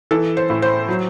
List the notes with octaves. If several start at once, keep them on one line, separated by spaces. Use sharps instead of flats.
E3 A4
C5
A2
C5
F#3